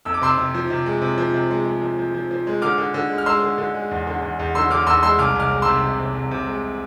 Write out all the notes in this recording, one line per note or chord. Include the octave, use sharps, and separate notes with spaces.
F2 E6
D6
C3 C6 E6
C3
F3
C3
G#3
C3
F3
C3
G#3
G#3
F3
F3
F3
F3
G#3
D3 D6 F6
D3
D3
G#3
F6
G#3 C6 E6
D3
D3
G#3
E2
D3
E2
E2
D3 C6 E6
D3 D6 F6
E2 C6 E6
G#3 C6 E6
C2 D6 F6
C2 D6 F6
G#3
C3 C6 E6
C3
C3
C2
C3
G#3